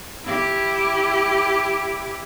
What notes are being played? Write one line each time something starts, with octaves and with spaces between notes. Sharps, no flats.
E4 G4